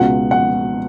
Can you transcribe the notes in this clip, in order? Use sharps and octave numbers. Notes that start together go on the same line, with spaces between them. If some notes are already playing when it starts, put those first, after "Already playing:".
Already playing: C#2 B2 F#5
F#5